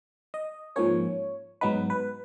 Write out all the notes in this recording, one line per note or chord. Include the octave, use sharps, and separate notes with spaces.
D#5
G#2 F3 A#3 C#4 C#5
G#2 F#3 B3 D#4 B4
B4